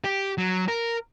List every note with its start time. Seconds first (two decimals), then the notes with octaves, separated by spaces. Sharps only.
0.04 G4
0.38 F#3
0.68 A#4